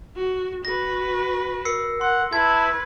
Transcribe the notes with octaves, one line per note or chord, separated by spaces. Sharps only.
F#4
F#4 B4 A#6
A#4 E6 C7 C#7
F#5 C6
E4 B4 A5 G#6